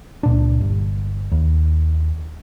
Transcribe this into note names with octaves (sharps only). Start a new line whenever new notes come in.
C#2 A#2 D4
G1
D#2